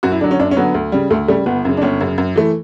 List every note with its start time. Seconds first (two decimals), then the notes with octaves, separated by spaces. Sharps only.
0.03 F#2 F#4
0.12 E4
0.21 D3 F#3 D4
0.31 C#4
0.40 F#2 D4
0.51 C#4
0.57 D3 F#3 B3
0.74 D2
0.92 C#3 G3
1.10 D2 A3
1.28 C#3 G3 A3
1.46 G1 B3
1.65 F#2 C#3
1.77 D4
1.82 G1 C#4
2.01 F#2 C#3
2.18 F#2
2.36 E3 A3